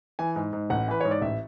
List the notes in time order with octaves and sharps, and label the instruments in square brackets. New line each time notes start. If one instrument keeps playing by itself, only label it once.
[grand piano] E3 G#5
G#2
G#2
A1 F#5
E3 B4
G#2 C#5
D5
A1 E5